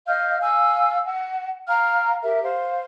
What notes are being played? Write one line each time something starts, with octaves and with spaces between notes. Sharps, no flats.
D#5 F5 F6 G6
F5 G#5 E6
F#5
F5 G5 A#5 F6
G4 A#4 E5
C5 F5